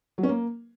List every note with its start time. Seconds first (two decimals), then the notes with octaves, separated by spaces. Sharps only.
0.18 F#3
0.23 C#4
0.29 A#3